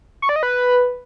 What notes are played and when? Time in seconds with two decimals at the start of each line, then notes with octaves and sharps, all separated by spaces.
0.22 C#6
0.29 D5
0.36 D#5
0.43 B4